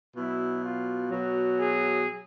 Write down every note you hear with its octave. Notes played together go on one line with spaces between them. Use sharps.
B2 F#3 E4
F4
B2 F#3
G#4